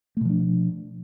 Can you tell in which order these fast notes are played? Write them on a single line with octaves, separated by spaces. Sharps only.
A3 B2 F3 D4